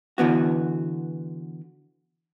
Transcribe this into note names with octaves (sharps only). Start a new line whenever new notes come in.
D3 E3 B3 F#4